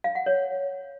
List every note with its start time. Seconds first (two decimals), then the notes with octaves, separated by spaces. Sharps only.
0.04 F5
0.15 F#5
0.26 C#5